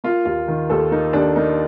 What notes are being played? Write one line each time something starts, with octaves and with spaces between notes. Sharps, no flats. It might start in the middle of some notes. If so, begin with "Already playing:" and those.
A#3 F4
D#2 F4
D#3
D#2 A4
A#3 D#4
D#2 D4
A#3 D#4